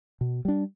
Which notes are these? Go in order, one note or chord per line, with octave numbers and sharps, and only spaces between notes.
B2
G3 D4